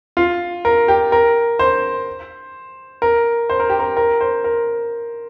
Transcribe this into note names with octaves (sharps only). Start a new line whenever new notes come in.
F4
A#4
G4
A#4
C5
A#4
C5
A#4
G4
A#4
A#4
C5
A#4